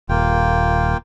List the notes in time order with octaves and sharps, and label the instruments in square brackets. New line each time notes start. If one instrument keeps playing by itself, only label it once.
[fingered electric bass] D#1 [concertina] A#3 F4 G5